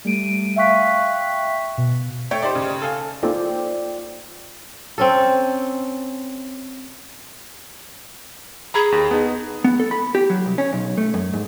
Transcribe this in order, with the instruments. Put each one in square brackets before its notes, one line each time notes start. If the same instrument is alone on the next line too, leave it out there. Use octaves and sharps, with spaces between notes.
[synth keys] G3 A3 D7 D#7
E5 F5 G5 C#6 F#6 B6
B2
[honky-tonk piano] A3 C#5 G5
[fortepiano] D#4 G4 C5 [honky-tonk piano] D5
[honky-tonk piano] C#3
[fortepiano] A4 F5 G#5
[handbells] A#3 D#4 A4 [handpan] F4 [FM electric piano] C5 D5 G5
[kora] C4 C#4 A4
[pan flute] G#4 [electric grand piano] A#5 B5 G#6
[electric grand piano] D#2
B3 D#4
[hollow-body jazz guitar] B3
A4
B5
G4
F#3
C2
C#4
B1
A3
F#2
G#2